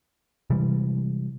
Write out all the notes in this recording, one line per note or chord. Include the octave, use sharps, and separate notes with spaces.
C3 E3 G3 G#3